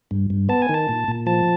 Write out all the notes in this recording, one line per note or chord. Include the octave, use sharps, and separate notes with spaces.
G2
G2
B3 A5
G#5
D#3
A5
A#2
A#2
F3 A5